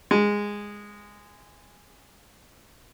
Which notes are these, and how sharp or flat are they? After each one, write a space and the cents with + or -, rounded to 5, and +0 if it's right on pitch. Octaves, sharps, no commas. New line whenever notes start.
G#3 -15